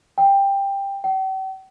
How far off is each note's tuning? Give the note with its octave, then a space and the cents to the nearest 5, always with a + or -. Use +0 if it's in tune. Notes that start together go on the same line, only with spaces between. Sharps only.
G5 +15
G5 -45